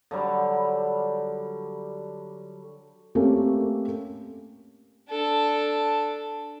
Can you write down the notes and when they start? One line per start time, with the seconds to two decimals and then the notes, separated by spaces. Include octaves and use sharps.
0.11 D3 F#3 G3
3.15 A3 A#3 C4 C#4 G4
5.10 D4 A4